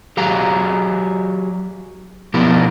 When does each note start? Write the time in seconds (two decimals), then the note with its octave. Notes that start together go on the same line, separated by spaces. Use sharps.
0.17 F#3 G4 G#4 F5 A#5
2.34 B2 F3 B3 E4 G4 A#4